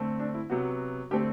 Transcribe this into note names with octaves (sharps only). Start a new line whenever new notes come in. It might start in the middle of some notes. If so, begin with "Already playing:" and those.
Already playing: D3 A3 C4
D4
E4
C3 F#3 B3 F#4
D3 A3 C4 G4